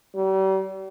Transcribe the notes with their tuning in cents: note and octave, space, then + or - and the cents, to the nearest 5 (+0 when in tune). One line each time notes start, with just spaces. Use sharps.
G3 -40